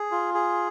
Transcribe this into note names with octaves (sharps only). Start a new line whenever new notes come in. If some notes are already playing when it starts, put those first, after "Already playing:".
Already playing: G#4
F4
G#4